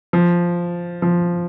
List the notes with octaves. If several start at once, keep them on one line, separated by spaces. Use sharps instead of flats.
F3
F3